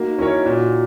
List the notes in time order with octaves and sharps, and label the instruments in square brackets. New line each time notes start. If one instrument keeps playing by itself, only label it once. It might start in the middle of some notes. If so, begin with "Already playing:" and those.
Already playing: [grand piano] A#3 [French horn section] D#4 F#4
[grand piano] C#4 E4 A#4 C#5
A#2